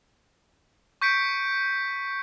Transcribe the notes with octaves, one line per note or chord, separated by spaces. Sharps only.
C#6 G6 B6 C#7 D7